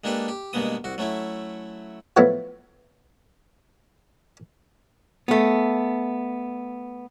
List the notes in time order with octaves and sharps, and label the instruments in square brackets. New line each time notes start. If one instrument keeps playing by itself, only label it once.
[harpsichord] G#3 A#3 D4 G4 A4 B4
G4
G2 B2 G#3 A#3 B3 D#6
C2 F#4
F#3 A3 C#4 E4
F3 F#3 A3 B3 E4
[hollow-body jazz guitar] A3 B3